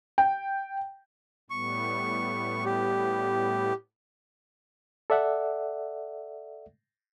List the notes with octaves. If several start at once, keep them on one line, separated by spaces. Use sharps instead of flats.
G5
A2 G3 B3 C#6
G4
A4 D5 E5 F#5